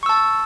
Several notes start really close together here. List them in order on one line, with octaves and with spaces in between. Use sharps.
C#6 E6 A5